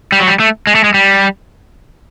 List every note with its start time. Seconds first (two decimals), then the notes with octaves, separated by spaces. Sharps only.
0.12 G3
0.20 F#3
0.28 G3
0.40 A3
0.67 G#3
0.75 A3
0.84 G#3
0.94 G3